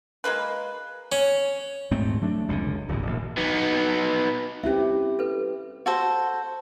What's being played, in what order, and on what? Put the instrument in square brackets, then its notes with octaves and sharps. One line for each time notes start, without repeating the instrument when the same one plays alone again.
[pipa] G#3 A#3 F4 B4
[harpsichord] C#4
[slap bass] D#1 G#2 A3 C4
F#3 A3 D4
F1 C#2 B2 D3
D1 G#1 E2 A#2
E1 A#1
[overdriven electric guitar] B3 D#4
[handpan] C4 E4 G4 [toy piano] C#4 E5
[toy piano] A4 B4
[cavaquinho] F#4 A4 C5